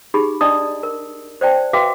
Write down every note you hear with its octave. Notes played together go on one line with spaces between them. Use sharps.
D#4 G4 G#4 B5
D4 D5 D#5 A5 D#6
A#4
C5 D5 G5 A5
F#4 B4 E5 F5 G5 D6